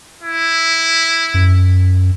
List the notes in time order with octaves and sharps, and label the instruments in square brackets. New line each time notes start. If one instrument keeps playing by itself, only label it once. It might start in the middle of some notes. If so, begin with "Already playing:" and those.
[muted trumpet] E4
[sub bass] F#2